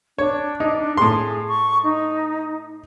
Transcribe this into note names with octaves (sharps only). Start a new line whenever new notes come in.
D4 C#5
D#4
A2 G#4 C6
C#6
D#4